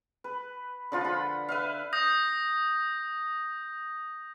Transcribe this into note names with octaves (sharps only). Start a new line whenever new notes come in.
B4
D3 F3 F4
F#5 B5
B4 E5 F5
D#6 G6 A#6